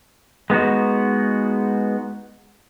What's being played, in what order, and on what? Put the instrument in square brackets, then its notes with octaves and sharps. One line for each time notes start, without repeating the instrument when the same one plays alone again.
[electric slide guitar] G#3 B3 D#4 F#4